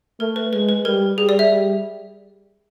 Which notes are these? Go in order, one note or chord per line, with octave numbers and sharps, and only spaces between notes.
A3 A#4
B4
G#3 B4
B4
G3 A#4
G3 G#4
D5
E5
G3